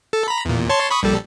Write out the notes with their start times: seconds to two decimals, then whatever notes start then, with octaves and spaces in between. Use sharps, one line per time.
0.13 A4
0.28 A#5 B5
0.45 E2 A#2
0.69 C#5 A5 C6
0.91 B5 C#6 D#6
1.03 A#1 G3 A4